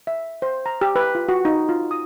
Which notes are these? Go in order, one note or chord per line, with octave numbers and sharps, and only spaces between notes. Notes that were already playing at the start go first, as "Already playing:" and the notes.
E5
C5
A#5
G4
B4
F4
F#4
D#4
F4
D#6